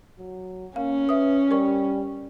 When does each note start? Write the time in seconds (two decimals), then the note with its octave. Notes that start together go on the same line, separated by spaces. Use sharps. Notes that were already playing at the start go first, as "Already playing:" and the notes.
0.19 F#3
0.76 A#3 C#4 F5
1.09 B4 E5 D#6
1.51 G3 A#4 C#6